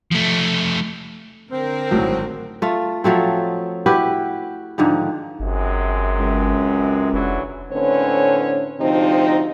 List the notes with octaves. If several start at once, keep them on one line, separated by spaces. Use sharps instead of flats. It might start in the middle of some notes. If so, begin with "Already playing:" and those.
F3 A3
D3 C4 A#4
G#1 A2 F#3
A3 F4
F3 F#3 A3 C4
E4 F#4 G4 B4
G#2 D3 D#3 F3
G1 F#2 C3 G#3
C#2
F1 D3 E3 F#3
A2 D3 C4 C#4 B4 C#5
D2 C3 F3 C4 D#4